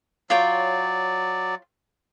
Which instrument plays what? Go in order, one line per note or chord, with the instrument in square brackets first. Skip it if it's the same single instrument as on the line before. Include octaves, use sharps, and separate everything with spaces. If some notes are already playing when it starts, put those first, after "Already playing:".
[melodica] F#3 D5 [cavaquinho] F4 C#5 G5